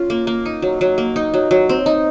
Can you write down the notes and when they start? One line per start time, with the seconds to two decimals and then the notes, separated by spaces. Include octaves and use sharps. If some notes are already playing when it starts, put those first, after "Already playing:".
Already playing: C#4 F4
0.10 A#3
0.27 A#3
0.46 D#4
0.62 F#3
0.81 F#3
0.98 A#3
1.16 D#4
1.34 F#3
1.51 F#3
1.69 C4
1.86 D#4